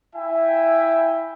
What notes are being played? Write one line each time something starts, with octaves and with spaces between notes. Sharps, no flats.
E4 E5 G5 G#5